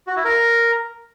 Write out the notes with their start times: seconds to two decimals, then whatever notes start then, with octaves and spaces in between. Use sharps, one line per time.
0.07 F#4
0.16 E4
0.25 A#4